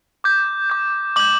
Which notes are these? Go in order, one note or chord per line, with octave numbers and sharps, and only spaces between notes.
D6 G6
D6 G6
D6 G6 F#7